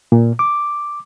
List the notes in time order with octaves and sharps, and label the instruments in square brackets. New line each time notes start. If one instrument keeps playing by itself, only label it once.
[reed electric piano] A#2
D6